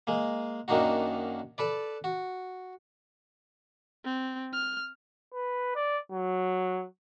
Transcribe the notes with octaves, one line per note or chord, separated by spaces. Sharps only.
G#3 A#3
F#2 D#3 A#3 D4 D#4 F#4
A4 B4 D5
F#4
C4
F6
B4
D5
F#3